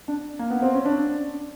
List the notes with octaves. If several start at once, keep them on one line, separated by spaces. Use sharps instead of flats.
D4
A#3
B3
C4
C#4
D4